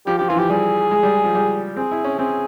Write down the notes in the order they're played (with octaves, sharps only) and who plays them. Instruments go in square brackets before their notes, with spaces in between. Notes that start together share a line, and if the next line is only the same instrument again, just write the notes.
[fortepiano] F3 [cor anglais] G4
[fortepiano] F3 [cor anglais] G4
[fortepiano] E3 [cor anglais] F4
[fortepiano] F3 [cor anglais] G4
[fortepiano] G3 [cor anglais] G#4
[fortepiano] G#3
G3
F3
G3
[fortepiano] C4 [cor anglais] G#4
[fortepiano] E4
C#4
[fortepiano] C4 [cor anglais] G#4